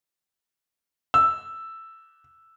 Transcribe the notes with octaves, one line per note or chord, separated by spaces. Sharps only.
E6